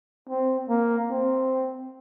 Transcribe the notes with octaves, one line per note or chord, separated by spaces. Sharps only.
C4
A#3
C4